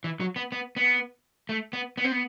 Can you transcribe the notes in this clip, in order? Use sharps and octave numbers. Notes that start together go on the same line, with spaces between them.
E3
F#3
B3
B3
B3
A3
B3
B3
C4
B3